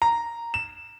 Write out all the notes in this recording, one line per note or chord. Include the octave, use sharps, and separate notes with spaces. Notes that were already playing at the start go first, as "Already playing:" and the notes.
A#5
E7